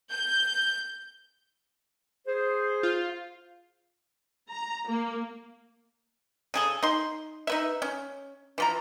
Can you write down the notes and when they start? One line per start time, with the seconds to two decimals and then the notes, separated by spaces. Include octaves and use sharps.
0.11 G6
2.26 G#4 C5
2.83 F4
4.49 A#5
4.88 A#3
6.54 C#3 G#4 A4
6.83 D#4 C6
7.47 D#4 B4 E5
7.82 C#4
8.58 E3 F3 A#5